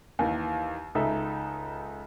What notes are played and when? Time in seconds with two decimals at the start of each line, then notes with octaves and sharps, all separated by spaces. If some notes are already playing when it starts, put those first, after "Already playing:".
0.19 D#2 D#3 E3
0.95 C#2 D#4 A4 E5